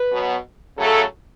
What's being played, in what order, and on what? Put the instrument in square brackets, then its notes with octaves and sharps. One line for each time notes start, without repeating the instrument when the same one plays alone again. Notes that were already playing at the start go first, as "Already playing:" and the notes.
Already playing: [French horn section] B4
B2 F#3 B3
C#3 F#3 A3 A4